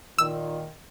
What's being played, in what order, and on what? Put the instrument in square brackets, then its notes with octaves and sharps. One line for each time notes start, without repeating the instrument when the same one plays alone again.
[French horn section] A#2 D#3 [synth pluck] E6